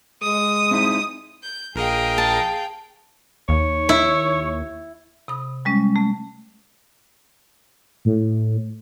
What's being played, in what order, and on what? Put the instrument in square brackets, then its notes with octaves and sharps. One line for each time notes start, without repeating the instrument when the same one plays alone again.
[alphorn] G#3 [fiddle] D#6
[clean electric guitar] C4 D#4 E4
[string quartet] G6
[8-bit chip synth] A#1 A#4 D#5 [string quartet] G#4 F5 G5
[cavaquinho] A5
[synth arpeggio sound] D#2 [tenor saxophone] C#5
[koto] E4
[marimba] C3 B5 D#6
G3 G#3 C#4
A3
[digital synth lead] A2